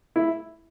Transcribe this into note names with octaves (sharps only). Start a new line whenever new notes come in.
E4